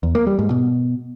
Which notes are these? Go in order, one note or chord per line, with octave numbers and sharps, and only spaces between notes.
E2
A#3
G3
G#2
B2